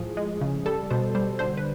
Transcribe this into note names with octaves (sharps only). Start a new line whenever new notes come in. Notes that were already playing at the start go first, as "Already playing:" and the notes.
Already playing: A2 F3 G#4
G#3
C#3
G3 A4
B2 C5
G3 C5
D3 C5
B4